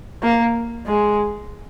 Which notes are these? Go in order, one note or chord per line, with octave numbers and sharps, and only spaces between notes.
A#3
G#3